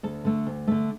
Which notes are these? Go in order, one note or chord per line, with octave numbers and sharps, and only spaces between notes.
D2 A4
D3 A3
D2
D3 A3